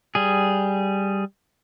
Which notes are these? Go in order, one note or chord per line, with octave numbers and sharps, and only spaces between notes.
G3 G#4